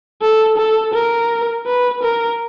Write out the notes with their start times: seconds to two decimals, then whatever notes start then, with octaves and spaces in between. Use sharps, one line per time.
0.21 A4
0.58 A4
0.94 A#4
1.66 B4
2.03 A#4